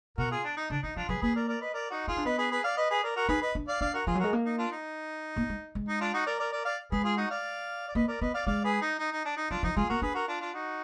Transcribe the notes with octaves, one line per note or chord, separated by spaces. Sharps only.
B2 F#4 A#4
F4 G#4
D4
D#4
D3 D4
D#3 D#4
F3 D4 F4
F#3 G#4 B4
A#3 G#4 B4
A#4 D5
A#4 D5
B4 D#5
A#4 D5
D#4 F#4
D#4 F4 G#4
D4
B3 B4 D#5
G#4 B4
G#4 B4
D5 F5
B4 D#5
G#4 B4
A#4 D5
F#4 A#4
D#4 G#4 B4
B4 D#5
D4
D5 F5
D4 D5 F5
F#4 A#4
F3 F4 G#4
F#3
G#3 F#4 A#4
A#3
D#4
D4 F4
D#4
A#3
G#3
G#3
D#4
D4 F4
D#4 F#4
A#4 D5
A#4 D5
A#4 D5
D5 F5
G#3 G#4 B4
F4 G#4
D#4 F#4
D5 F5
D5
A#3 B4 D#5
A#4 D5
B3 B4 D#5
D5 F5
G#3 D5 F5
G#4 B4
D#4
D#4
D#4
D4
D#4
F#3 D4 F4
F3 D#4
G#3 F4 G#4
A#3 F#4 A#4
D4 G#4 B4
F#4 A#4
D4 F4
D4 F4
D#4 F#4